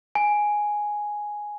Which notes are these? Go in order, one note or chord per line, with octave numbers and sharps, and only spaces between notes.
G#5